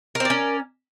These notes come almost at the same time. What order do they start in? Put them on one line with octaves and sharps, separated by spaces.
A#4 C4 D5 C#4